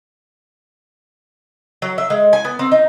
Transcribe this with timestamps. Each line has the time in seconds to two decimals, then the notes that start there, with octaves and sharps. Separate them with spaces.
1.82 F#3
1.98 E5
2.10 G#3
2.33 G#5
2.45 B3
2.59 C4
2.72 D#4